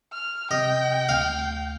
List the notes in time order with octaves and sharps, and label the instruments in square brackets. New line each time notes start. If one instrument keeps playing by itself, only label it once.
[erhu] F6
[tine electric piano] C3 [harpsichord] D#5 [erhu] G5
[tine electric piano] D2 [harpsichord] F5